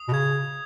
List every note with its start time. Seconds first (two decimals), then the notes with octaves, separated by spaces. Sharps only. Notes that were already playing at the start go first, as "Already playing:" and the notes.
Already playing: D#6
0.09 B2
0.13 C#3 G#6